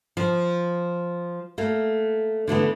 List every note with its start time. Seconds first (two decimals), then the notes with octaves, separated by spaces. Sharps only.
0.17 F3
1.58 A3 A#3
2.48 D3 E3 A3 B3